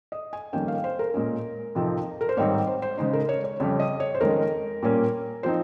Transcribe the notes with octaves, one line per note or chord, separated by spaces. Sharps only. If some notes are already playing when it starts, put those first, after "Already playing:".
D#5
G#5
F2 D#3 G3 A#3 C#4 G5
F5
C5
A#4
A#2 G#3 C#4
F2 C3 F3 C4 D#4
A#4
C5
G#2 D#3 G3 C4 D#4 C#5
C5
C5
C#3 G#3 D#4 C5
A#4
C#5
C#5
F2 C#3 G3 C#5
D#5
C#5
C5
F2 D#3 G#3 C#4 A#4
A#2 G3 A#3 C#4
F3 C4 D#4 C5